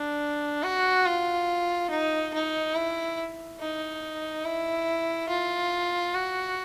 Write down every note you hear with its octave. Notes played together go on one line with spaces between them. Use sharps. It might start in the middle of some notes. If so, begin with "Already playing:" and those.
Already playing: D4
F#4
F4
D#4
D#4
E4
D#4
E4
F4
F#4